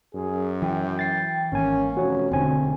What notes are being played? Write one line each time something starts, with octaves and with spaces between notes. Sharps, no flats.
F#2 G#4
E3 G5
A6 C7
G#1 A#3 C#4 G#5
F1 C#4 F#4 C#5
E1 D2 D3 C4 C5 G#5